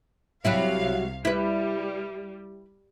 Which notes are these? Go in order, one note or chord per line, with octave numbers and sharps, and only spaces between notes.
C2 C3 F#3 G3 E4 F5
G3 E4 B4